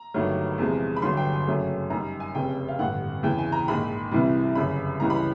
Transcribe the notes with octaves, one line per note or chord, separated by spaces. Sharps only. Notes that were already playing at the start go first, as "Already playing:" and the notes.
Already playing: A#5
G1 G2 D#3 F#3 A3
E2 C3 F3 G#3
B5
G1 G2 D3 F#3 C6
G5
G#5
F#2 C#3 F#3 A3
F#2 D#3 G3 A#5
G#5
F1 F2 C#3 G5
F5
A1 G2 D3 F#5
E2 C#3 E3 G5
G#5
A#5
A#1 G#2 D#3 B5
C2 C3 E3 G3
G1 F#2 C#3 B5
C#2 C#3 E3 G3 A#5
B5